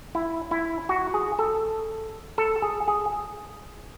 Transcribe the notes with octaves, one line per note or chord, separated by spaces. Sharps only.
E4
E4
F#4
G#4
A4
A4
G#4
G#4